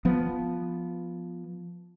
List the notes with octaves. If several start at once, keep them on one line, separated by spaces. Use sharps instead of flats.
F3 B3